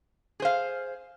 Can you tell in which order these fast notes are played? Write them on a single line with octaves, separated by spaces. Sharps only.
G#4 C5 F5